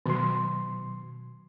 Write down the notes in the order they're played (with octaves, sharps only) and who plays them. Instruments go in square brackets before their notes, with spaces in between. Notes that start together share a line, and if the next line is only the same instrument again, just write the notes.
[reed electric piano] B2 F#3 C6 [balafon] D#3